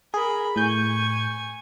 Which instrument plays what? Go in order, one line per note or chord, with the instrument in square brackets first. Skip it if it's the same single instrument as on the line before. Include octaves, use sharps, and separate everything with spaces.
[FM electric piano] G#4 [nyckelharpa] A#4 B5
[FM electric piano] A2 G6 [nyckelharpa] G#5 C#6